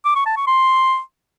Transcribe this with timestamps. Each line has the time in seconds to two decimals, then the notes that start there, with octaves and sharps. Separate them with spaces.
0.05 D6
0.16 C#6
0.26 A5
0.37 C#6
0.47 C6